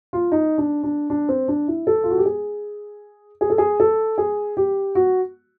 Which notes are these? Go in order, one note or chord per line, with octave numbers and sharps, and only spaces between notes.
F4
D#4
D4
D4
D4
C4
D4
E4
A4
F4
F#4
G4
G#4
G#4
A4
G#4
A4
G#4
G4
F#4